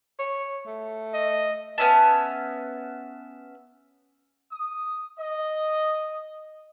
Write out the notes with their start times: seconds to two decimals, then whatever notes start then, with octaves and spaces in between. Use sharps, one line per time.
0.19 C#5
0.66 A3
1.14 D#5
1.78 B3 C#4 E5 A5
4.52 D#6
5.20 D#5